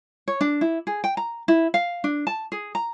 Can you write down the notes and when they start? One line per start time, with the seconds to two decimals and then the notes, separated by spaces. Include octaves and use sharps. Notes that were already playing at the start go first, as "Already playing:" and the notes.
0.28 C#5
0.41 D4
0.61 E4
0.87 G#4
1.04 G5
1.17 A#5
1.48 E4
1.74 F5
2.04 D4
2.27 A5
2.52 G#4
2.75 A#5